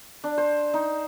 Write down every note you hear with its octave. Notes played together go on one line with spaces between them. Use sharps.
D4
C5
D#4